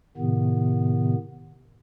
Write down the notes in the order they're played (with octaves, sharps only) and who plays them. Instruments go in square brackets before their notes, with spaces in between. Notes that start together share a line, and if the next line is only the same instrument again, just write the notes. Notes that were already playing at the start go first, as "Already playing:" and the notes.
[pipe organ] A2 C3 D#3 B3